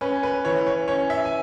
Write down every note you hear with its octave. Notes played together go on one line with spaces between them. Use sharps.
C#4 B4
B4
E3 C#5
C#5
C#4 C#5
E5
G#5